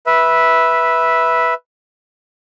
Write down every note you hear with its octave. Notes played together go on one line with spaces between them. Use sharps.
B4 E5